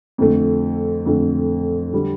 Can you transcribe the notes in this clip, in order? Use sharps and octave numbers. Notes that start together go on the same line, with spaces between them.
F2 D3 A3
F2 D3 A3
D3 G3